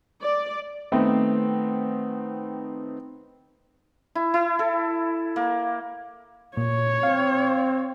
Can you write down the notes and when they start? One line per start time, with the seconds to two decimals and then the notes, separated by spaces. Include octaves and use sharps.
0.22 D5
0.92 D#3 A3 B3 C4 D#4
4.15 E4
4.34 E4
4.59 A4
5.36 A#3
6.57 A#2 C#5
7.03 C4 F5